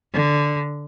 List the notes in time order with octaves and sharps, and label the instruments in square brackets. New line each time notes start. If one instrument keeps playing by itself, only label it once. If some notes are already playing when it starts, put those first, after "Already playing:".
[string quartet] D3